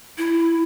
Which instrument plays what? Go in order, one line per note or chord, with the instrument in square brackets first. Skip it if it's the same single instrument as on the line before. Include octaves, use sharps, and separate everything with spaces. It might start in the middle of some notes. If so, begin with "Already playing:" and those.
[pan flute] E4